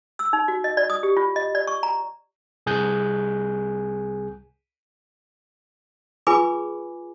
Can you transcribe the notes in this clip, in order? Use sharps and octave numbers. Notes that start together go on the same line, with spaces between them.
E6
D#4
F#4
D#5
D5
D#6
G4
F4
D#5
D5
C#6
A#5
C2 G#4 G#5 F#6 G6
F4 G#4 B4 G#5 B5 D6